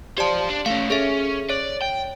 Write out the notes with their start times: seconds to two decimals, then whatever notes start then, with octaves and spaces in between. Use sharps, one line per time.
0.18 F4 G4 C5 D5 A5
0.49 D4
0.66 A3 C#4 F5
0.90 C#4 G#4 A4 E5
1.50 C#5 D5
1.82 G5